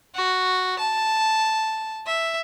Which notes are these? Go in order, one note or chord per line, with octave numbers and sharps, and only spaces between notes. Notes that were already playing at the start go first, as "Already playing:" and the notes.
F#4
A5
E5